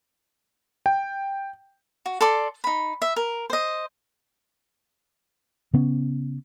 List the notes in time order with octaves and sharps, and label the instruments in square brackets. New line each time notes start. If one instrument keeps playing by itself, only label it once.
[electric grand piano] G5
[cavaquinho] F#4
A4 D5 C6 D6
D#4 B5
E5
A#4
C5 D#5
[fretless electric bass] C#3 B3 C#4